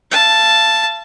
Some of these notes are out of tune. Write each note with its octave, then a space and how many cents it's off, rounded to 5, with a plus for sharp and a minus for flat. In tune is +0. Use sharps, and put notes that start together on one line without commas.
F5 -45 A5 +0